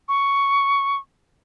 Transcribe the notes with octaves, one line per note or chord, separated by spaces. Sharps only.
C#6